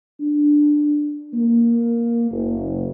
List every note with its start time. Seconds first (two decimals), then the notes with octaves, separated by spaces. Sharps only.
0.20 D4
1.33 A#3
2.30 F#1